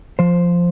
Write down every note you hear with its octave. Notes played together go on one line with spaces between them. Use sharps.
F3 C5